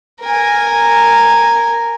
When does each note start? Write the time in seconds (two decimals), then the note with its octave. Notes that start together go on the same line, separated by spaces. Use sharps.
0.22 A#4 G#5